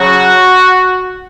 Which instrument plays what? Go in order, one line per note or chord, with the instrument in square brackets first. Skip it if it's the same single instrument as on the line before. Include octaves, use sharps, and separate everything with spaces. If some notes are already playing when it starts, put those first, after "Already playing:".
Already playing: [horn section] C#3 F#3 C#4 F#4